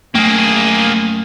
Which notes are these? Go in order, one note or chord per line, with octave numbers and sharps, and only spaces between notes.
F#2 A3 A#3 G#4 G5